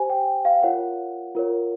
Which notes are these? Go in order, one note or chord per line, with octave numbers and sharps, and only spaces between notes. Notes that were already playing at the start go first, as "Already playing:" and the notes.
Already playing: G4 C5 G#5
G5
F5
F4 A#4 C#5 F#5
F4 A#4 C#5